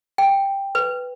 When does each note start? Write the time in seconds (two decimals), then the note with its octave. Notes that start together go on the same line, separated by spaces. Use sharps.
0.18 G5
0.75 B4